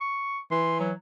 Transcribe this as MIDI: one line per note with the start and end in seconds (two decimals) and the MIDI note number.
0.01 0.38 85
0.51 0.92 52
0.51 0.76 84
0.80 0.93 54